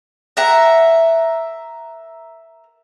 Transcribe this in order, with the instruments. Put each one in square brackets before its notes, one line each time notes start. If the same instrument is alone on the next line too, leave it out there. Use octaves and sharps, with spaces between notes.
[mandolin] A#4 E5 F#5